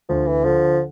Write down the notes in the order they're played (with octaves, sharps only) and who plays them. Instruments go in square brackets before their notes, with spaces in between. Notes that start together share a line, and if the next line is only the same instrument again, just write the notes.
[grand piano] D2 [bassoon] F3
[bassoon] E3
[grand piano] D3 [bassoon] F3